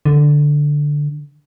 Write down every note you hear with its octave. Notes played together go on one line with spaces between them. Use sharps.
D3